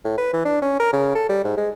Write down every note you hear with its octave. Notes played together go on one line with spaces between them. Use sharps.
A2
B4
E3
D4
C#4
A#4
C#3
A4
G3
G#2
G#3